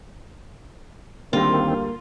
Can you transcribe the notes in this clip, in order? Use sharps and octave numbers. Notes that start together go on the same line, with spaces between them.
D2 D#3 G3 A#3 C4 F4 A#6